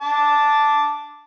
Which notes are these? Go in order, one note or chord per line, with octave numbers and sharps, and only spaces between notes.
A5 D6